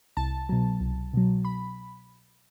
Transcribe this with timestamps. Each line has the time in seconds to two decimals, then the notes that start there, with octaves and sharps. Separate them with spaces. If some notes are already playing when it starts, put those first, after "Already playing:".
0.17 C2 A5
0.49 B2 F#3
0.81 C2
1.13 B2 F#3
1.45 B5